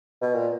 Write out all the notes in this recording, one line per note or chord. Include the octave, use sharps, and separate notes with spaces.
B2
A#2